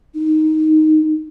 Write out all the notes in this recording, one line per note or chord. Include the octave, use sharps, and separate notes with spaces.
D#4